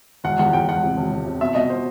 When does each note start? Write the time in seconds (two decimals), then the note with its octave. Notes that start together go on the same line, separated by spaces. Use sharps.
0.24 E1 F#5
0.39 E2 F#5
0.53 E1 G5
0.68 E1 F#5
0.83 C3
0.97 E1
1.12 E1
1.26 C3
1.41 B2 E5
1.55 B2 D#5
1.70 C5